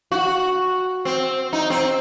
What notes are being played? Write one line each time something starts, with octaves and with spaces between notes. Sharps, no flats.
F#4
C4
D#4
C4